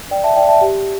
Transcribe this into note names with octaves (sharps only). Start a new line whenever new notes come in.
D5 G5
E5 A5
D5 G5
E5 A5
G4